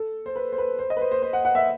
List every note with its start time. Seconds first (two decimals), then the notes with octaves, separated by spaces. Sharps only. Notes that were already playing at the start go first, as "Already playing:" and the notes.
Already playing: A4
0.26 C5
0.36 B4
0.53 C5
0.58 B4
0.79 C5
0.90 D#5
0.97 B4
1.01 C5
1.12 C5
1.22 C5
1.33 F#5
1.45 F#5
1.55 E5